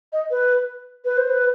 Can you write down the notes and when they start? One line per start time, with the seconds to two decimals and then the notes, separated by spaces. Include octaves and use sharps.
0.13 D#5
0.31 B4
1.05 B4
1.17 C5
1.30 B4